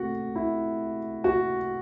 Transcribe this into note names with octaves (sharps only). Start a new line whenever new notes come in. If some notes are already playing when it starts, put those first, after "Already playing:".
Already playing: C3 A3 F#4
E4
F#4